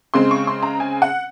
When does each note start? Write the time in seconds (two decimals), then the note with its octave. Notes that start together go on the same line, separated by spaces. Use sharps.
0.14 C#3 G#3 C4 C6
0.31 C#6
0.47 C6
0.63 A#5
0.80 G#5
1.02 F#5